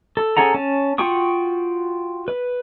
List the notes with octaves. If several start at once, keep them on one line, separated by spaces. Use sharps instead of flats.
A4
C#4 G#4 A4 F#5 A#5
C#4 A5
F4 F#4 G5 C#6 D#6
B4